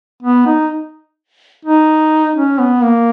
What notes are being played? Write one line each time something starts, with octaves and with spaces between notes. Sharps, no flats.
B3
D#4
D#4
C#4
B3
A#3